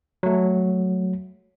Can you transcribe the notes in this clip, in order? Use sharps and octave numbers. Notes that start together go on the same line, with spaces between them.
F#3 A3